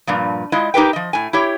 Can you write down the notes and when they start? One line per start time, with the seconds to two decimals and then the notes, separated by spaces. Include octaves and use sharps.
0.07 G2 A#2 F3
0.52 G#3 E4 F4 D#5
0.74 D#4 G4 A#4 B4 G5
0.93 F3 D#5
1.13 A2 G#5
1.33 E4 G4 C#5